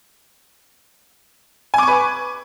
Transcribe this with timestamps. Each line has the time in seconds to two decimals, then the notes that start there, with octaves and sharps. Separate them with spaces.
1.74 G#5
1.78 D6
1.83 C#6
1.88 B4